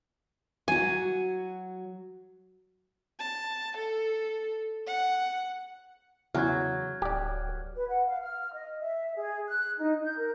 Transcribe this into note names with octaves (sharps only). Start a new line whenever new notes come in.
F#3 F#4 G#5
A5
A4
F#5
E2 C#3 F#3 F6 F#6 G#6
D1 G4 D5
B4
F#5
F5
F6
D#5
E5
G#4
F#6
D#4
G6
A#4